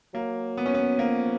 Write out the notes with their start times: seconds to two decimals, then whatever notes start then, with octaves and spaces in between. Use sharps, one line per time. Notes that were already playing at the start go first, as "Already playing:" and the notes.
0.14 F#3 A#3
0.57 B3
0.66 C#4
0.74 B3
0.99 F3 A#3